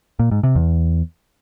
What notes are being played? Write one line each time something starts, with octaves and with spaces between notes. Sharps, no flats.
A#2
G#2
C3
E2